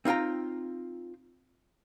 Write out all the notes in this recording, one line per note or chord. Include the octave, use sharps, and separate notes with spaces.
C4 D#4 F4 G5 A#5